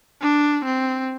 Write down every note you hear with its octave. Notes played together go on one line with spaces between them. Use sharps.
D4
C4